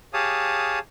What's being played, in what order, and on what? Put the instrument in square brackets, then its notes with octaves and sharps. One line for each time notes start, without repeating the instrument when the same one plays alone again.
[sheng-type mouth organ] G4 G#4 C#5 F5 A5 D#6